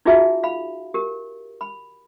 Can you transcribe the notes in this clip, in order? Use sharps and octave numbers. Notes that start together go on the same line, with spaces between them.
D#4 F4 F#4 G#4 E5 G#5
F5 B5
G4 A#4
B5